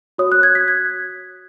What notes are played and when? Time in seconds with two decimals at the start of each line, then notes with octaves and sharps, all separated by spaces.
0.18 F#4 C#5 D#6
0.32 F#6
0.43 G#6
0.55 B6
0.68 G#6